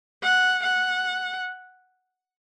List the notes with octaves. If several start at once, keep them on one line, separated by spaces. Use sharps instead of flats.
F#5
F#5